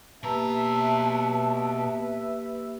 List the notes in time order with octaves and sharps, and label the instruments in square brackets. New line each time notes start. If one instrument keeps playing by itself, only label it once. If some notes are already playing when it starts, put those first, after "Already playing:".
[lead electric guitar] B2 A#5 [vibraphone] A#3 G4 E6 [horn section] B4 E5 [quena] A5